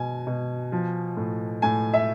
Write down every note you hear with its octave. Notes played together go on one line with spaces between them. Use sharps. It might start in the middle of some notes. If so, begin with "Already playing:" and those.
Already playing: B2 G#5
B2
F3
A2
A2 G#5
E5